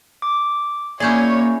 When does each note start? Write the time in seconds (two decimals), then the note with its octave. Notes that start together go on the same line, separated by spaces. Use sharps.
0.22 D6
1.00 A#3 C#4 E4 G#4 C#5 D5 G6